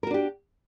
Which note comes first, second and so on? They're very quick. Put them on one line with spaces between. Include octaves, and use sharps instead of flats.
A#4 F#4 D4 G4